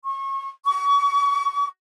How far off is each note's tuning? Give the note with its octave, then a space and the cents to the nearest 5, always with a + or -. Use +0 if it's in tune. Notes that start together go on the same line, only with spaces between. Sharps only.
C#6 -30
C#6 +30